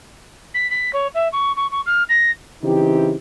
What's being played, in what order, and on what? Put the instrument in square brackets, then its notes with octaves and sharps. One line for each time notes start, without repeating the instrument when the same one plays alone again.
[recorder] B6
B6
C#5
E5
C#6
C#6
C#6
F6
A#6
[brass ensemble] C#3 E3 C4 D#4 E4 G4